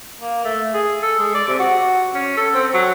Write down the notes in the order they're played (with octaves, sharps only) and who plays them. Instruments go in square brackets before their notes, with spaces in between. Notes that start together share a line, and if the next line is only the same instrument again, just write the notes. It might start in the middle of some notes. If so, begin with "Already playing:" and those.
[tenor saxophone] A#3
A3
G#4
A4
G#3
D5
C3
F#4
C#4
A4
C4
F#3